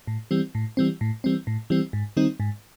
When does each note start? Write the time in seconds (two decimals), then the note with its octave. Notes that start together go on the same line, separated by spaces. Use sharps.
0.07 A2
0.31 E3 G3 C4
0.55 A2
0.77 E3 G3 C4
1.01 A2
1.24 E3 G3 C4
1.47 A2
1.70 E3 G3 C4
1.93 G#2
2.17 D#3 G3 C4 D#4
2.40 G#2